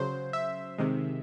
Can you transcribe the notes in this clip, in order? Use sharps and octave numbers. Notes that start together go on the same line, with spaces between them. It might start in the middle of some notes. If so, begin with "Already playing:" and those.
Already playing: C#3 F#3 C5
E5
C3 D#3 G#3